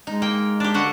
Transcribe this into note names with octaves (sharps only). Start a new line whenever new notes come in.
G#3 D#4
A#3 G5
D4 G4
D3 F#4 F#5